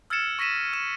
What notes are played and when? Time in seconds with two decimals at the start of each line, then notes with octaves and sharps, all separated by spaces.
0.10 E6 F6 G#6 A6 C#7 E7
0.39 C#6 A#6 B6 D#7 E7
0.73 F6 E7